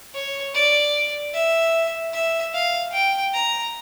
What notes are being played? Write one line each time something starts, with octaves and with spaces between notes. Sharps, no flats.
C#5
D5
E5
E5
F5
G5
A#5